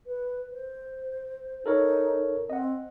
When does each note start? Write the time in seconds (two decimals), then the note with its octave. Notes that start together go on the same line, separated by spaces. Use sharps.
0.06 B4
0.52 C5
1.66 D#4 A4 A#4 C#5
2.50 C4 D#5 F#5